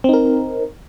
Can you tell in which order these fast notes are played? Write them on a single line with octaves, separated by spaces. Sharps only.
C4 D#4 A#4